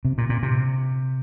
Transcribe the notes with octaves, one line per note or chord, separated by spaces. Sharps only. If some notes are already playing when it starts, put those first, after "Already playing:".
C3
A#2
A#2
C3